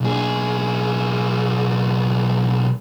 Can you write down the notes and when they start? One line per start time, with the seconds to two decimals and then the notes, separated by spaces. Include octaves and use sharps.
0.01 B1 G#4